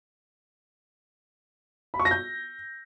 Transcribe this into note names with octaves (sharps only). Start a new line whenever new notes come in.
B5
C#6
A#6
G6